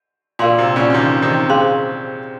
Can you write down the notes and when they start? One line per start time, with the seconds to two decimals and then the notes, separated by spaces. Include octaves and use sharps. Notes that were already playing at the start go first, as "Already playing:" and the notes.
0.39 A#2 A#4 F5 C6
0.59 C3
0.76 A#2 C#3
0.90 C#3
0.94 C3 D#3
1.22 C3 D#3
1.49 C#4 G#4 C5 F5 C6